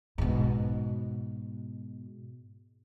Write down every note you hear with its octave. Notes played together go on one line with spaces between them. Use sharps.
G#2 B2